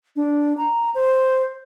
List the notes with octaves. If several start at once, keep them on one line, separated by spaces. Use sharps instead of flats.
D4
A#5
C5